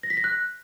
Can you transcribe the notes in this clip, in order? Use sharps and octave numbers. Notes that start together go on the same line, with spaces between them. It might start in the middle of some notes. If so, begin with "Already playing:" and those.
A#6
B6
A#6
F#6